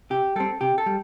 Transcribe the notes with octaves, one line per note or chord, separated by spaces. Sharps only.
C3 G4
G3 C4 A4
C3 G4
A4
G3